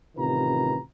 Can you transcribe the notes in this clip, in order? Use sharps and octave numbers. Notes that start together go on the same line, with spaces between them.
A1 C3 D#3 F4 B4 A#5